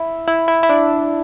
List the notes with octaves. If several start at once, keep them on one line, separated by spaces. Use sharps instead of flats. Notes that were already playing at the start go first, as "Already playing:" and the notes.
Already playing: E4
E4
E4
E4
D4